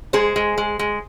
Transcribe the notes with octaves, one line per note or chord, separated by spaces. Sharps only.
G#3 G#4 C5
G#3
G#3
G#3